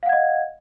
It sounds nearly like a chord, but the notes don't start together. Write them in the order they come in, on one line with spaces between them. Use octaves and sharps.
F5 F#5 G#6 D#5